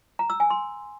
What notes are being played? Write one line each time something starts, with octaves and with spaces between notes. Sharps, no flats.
A#5
E6
G#5
C6